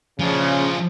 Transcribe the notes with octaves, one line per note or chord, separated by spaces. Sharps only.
C#3 F3 D4